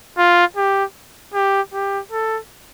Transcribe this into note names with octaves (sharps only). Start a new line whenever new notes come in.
F4
G4
G4
G4
A4